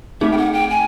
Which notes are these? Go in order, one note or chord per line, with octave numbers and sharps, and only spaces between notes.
A3 C4 D#4 G#4 E5
G5
F#5
G5
G#5